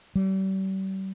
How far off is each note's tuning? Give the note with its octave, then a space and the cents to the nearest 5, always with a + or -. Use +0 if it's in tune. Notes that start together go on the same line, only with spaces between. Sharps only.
G3 -40